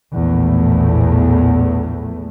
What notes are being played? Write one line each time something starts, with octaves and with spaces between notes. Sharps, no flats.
A#1 E2 A2 A3